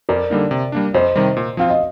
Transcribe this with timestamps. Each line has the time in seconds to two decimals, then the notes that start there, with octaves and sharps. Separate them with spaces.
0.09 F2 A#4 D5
0.30 D3 G3 A#3 D#4
0.51 C3
0.72 G3 A#3 D4
0.94 F2 C5 D#5
1.16 C3 D#3 G3
1.37 A#2
1.57 F3 C4 F4 F5
1.70 D#5